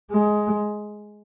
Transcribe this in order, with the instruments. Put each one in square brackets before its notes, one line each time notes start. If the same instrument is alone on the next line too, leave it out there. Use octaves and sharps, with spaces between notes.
[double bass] G#3